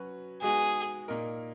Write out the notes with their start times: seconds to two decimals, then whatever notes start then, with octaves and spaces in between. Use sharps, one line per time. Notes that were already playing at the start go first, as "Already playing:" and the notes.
Already playing: F#3 C#4 F#4 B4
0.42 G#3 B3 D#4 F#4 G#4
1.08 A#2 A#3 D#4 A#4